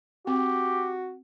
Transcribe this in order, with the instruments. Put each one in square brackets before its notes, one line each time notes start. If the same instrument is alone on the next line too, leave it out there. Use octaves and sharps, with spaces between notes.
[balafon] C4 [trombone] F#4 [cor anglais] G4